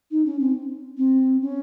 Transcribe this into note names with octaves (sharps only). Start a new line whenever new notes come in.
D#4
C#4
C4
C4
C#4